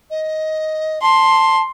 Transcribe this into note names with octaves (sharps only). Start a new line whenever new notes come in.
D#5
A5 C6